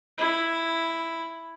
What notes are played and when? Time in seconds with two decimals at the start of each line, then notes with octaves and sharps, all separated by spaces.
0.18 E4